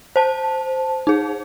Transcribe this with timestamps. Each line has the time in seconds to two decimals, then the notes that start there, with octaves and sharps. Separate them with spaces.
0.16 C5 A5
1.07 D#4 G#4